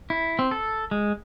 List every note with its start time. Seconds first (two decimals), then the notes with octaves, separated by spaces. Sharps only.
0.10 E4
0.39 C4
0.51 A4
0.91 G#3